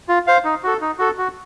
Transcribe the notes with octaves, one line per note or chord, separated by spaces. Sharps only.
F4
C5 F5
D#4
F#4 A4
D#4
F#4 A4
F#4